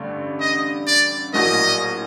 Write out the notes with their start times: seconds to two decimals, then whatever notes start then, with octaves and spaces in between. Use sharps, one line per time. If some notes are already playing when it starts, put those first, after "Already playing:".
Already playing: A1 G2 D3 A3
0.40 D#5
0.87 D5
1.33 A#1 A2 F#3 A#3 D#5